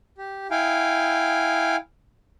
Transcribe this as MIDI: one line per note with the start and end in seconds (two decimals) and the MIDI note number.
0.18 0.47 67
0.51 1.76 64
0.51 1.76 77
0.51 1.76 79
0.51 1.76 80